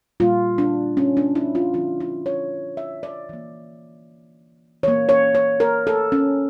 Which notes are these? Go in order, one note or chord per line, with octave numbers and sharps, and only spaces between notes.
A#2 G3 A#3 F4
D4
C#4
D4
E4
F4
D3 F3 A3 F4
E4
C#5
E5
D5
E3 A#3
E3 A#3 C#5
C#5
C#5
A#4
A4
C#4